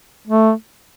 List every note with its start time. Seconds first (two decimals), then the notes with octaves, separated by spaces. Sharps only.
0.27 A3